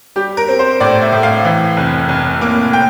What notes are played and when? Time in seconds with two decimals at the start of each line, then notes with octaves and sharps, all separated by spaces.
0.16 G3 G4
0.37 A#4
0.48 C4
0.59 C5
0.80 A2 D5
1.02 E5
1.12 A2
1.23 F5
1.45 E3
1.77 F1
2.09 F1
2.41 A#3
2.73 G5